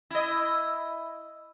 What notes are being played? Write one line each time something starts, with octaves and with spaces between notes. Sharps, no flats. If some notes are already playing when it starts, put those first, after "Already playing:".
E4 D#5